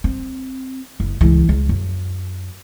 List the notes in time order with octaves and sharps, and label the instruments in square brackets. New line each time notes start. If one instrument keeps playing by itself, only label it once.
[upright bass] C4
F#1
C#2 E3
C#2
F#2